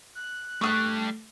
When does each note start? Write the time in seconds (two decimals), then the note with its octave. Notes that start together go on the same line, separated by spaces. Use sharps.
0.15 F#6
0.61 G3 A3 D4 C#6 D#6 F#6